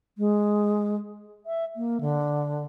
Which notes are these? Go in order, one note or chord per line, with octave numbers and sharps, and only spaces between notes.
G#3
E5
A#3
D3